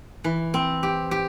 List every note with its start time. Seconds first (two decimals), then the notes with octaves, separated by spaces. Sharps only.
0.24 E3
0.54 C4
0.83 G4
1.11 G4